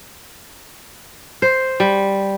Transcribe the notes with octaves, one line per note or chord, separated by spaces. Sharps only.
C5
G3